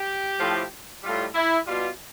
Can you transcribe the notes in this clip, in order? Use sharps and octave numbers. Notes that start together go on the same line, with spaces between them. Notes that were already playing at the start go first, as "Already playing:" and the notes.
Already playing: G4
A2 F3
A2 G3 F4
E4
B2 G3 F4